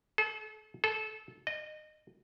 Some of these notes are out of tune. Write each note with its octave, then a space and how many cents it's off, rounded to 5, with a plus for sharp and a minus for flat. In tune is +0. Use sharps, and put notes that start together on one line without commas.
A4 -40
A4 -25
D#5 -25